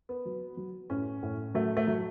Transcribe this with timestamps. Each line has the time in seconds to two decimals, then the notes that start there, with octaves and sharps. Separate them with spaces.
0.09 B3
0.25 F#3
0.57 F#3
0.90 A2 C#4
1.22 A2
1.54 F#3 A3
1.77 A3
1.87 F#3